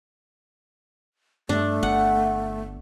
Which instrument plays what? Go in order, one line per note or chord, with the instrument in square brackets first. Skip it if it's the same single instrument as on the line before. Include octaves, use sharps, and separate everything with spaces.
[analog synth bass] G2 [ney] A3 [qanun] D4
[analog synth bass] G1 [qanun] F#5